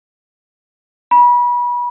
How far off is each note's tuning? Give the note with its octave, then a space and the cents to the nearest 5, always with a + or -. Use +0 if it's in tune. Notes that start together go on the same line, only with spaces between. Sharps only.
B5 -30